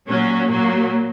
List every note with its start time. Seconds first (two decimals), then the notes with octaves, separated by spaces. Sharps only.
0.08 A#2 F#3 C#4
0.49 A#2 F#3 A#3